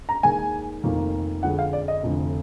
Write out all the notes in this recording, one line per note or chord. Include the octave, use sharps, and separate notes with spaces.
A#5
D#2 D#3 G#3 G#5
F1 F2 D#3 A#3
F2 D3 G#3 F#5
F5
D5
D#5
F1 F2 D3